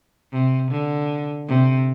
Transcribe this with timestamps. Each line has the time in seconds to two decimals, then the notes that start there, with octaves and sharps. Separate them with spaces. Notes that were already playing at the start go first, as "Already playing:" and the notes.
0.33 C3
0.71 D3
1.48 C3